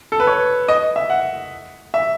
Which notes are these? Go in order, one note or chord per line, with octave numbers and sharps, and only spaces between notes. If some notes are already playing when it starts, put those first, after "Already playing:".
A4
B4
C#5
D#5
E5
F#5
E5